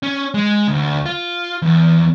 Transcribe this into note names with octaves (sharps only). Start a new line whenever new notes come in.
C#4
G#3
D2
F4
E2